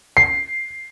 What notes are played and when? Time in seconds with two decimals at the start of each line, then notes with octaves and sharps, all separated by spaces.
0.17 C7